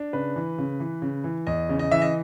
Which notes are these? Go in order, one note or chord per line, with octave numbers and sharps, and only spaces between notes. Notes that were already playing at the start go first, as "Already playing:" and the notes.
Already playing: D4
C#3 B4
E3
C#3
E3
C#3
E3
E2 D#5
C#3
D#5
E3 E5
D#5